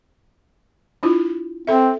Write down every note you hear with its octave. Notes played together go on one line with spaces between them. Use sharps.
D4 E4 F4
C4 A4 E5